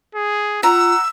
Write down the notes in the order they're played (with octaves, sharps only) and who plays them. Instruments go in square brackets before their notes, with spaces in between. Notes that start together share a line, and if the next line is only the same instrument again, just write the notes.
[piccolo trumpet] G#4
[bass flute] F4 [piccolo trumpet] F#5 [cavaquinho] A#5 [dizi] E6